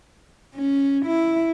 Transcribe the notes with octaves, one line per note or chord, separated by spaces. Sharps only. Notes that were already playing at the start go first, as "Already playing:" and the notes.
C#4
E4